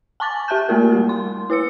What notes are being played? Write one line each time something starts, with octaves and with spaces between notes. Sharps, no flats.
G#5 A5 C#6 D6 A6
G4 E5 A5 F#6 G6
A3 A#3 F4 A#4
G3
C6
E4 B4 E6 C#7